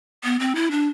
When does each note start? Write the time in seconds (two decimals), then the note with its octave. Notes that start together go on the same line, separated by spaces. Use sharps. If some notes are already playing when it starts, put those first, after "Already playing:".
0.24 B3
0.40 C4
0.55 E4
0.71 D4